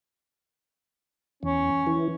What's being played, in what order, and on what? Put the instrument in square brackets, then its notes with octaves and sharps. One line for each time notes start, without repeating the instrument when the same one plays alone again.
[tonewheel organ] E2 [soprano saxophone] C#4
[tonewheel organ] E3